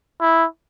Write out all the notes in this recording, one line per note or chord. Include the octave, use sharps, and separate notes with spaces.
E4